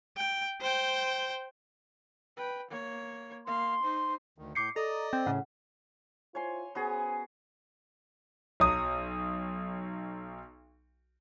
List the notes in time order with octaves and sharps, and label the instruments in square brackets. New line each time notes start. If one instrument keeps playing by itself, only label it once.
[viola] G5
C5 G5
[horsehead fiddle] B4 G5
A#3 C#5
[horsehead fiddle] A#3 F5 [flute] C6
[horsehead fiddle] D#4 C5
[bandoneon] D2 D#3
[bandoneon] A2 G6 [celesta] D6 C7 C#7
[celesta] A4 [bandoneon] D5 D#5 D#6 [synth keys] A#5
[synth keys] C4
[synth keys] A2 C#3 [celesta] F#5
[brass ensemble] E4 F4 C5 [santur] C#5 G#5 C6
[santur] B3 F#4 G#4 [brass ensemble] C#4 C5 G#5
[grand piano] B1 F#3 D#6